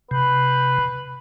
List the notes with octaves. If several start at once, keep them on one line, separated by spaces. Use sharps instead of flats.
C3 B4